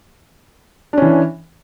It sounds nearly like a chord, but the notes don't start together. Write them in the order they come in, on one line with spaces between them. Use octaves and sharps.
D4 C#4 E3